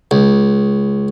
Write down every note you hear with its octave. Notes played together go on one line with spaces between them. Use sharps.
C#2